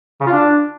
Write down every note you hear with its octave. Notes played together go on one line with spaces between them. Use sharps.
C#3
F4
D4